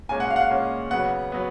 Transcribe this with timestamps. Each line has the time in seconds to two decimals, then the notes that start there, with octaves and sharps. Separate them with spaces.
0.09 A#2 G#3 C#4 G#5
0.20 F#5
0.30 F5
0.36 F#5
0.41 F5
0.50 A#2 G#3 C#4
0.91 C#3 F#3 B3 F#5
1.32 F#3 B3